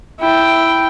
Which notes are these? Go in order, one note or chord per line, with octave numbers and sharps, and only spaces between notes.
E4 G5